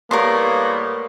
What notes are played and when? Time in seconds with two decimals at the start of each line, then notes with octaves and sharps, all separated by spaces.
0.11 A2 G3 A#3 B3 A#4 C#5 C6